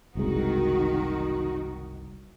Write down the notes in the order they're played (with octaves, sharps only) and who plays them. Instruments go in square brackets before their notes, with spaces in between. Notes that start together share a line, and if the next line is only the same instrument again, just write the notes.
[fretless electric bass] F#1 C2 G#3 [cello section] D#3 D#4 F#4